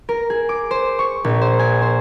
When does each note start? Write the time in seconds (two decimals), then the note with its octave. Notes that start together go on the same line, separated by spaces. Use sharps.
0.09 A#4
0.30 G#4
0.49 D6
0.71 C5
0.99 C#6
1.24 A#1
1.41 C5
1.59 G#5
1.82 C5